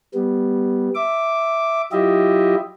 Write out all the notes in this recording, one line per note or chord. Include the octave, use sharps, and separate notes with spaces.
G3 B3
E5 D6
F#3 E4 F4 G4 D#5 E5